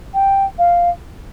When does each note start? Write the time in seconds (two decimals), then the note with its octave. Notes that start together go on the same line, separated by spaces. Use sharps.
0.14 G5
0.58 F5